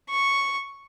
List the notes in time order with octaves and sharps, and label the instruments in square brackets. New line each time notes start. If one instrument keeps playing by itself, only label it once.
[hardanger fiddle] C#6